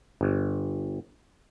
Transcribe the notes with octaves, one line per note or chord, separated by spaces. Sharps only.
G1